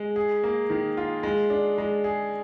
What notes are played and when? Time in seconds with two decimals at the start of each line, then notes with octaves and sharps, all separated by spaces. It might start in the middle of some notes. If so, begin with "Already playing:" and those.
Already playing: G#3
0.16 G#4
0.44 A#3
0.70 D#3
0.97 F4
1.23 G#3
1.50 D4
1.78 G#3
2.04 G#4